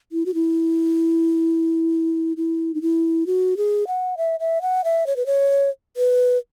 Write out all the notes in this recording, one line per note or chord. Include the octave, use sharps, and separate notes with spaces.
E4
F#4
E4
E4
D#4
E4
F#4
G#4
F#5
E5
E5
F#5
E5
C#5
B4
C#5
B4